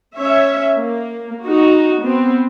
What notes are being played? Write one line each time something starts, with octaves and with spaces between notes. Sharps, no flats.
C#4 C#5 E5
A#3
D#4 F#4
B3 C4